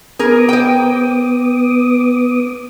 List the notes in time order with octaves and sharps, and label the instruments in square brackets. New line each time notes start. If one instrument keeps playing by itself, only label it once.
[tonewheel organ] B3 D6 D#6 [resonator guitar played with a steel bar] G#4 A#4
[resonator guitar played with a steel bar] C5 G5